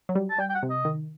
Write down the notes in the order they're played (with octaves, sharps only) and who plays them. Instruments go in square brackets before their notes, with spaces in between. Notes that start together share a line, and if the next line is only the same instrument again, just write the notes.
[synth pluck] F#3
G3
[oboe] A5
[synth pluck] G3 [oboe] G5
[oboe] G5
F#5
[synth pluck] C3
[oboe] D#5
[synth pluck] D#3